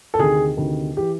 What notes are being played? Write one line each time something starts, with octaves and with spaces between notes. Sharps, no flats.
A4
D2 C3 D#3 G#4
D2 C3 D#3
E3 G4